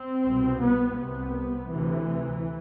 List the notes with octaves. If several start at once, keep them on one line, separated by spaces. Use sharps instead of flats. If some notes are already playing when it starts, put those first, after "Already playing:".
Already playing: C4
C2 B2
B3
C2 C3 B3
D2 C3 E3